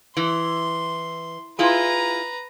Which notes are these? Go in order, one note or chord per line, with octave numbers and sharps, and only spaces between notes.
E3 C6
E4 F4 G#4 B4 A#5